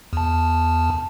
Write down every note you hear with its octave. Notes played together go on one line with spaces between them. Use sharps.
E2 A5